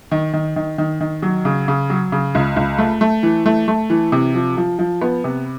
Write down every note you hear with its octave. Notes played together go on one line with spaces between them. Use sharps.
D#3
D#3
D#3
D#3
D#3
F#3
C#3
C#3
F#3
C#3
C#2
C#2
A3
A3
E3
A3
A3
E3
C3
F3
F3
F3
B3
C3